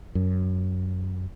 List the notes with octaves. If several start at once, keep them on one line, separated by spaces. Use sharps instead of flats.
F#2